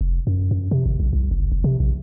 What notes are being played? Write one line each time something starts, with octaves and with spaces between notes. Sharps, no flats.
F1
F#2
F#2
C3
G#1
B1
C2
F#1
F#1
C3
A#1